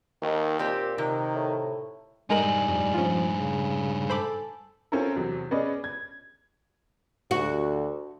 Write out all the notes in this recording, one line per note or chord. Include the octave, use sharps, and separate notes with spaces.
D#2 D#3
A#2 C4 G4
C3 D#3
A2
G2 G3 G#3 D#4 A#4 G#5 F#7
F2 G3
F3 C#4 F4
C#3
A4 C5 B5 D6
C4 C#4 E4 F4 A4 A#4
E2 C3 F#3 C4
B3 C#4 G#4 B4 D5 D#5
G#6
D2 F#4